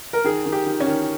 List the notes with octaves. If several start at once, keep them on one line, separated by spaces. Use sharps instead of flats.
A#4
D#3 G#4
D#3
G4
D#3
C#4
D#3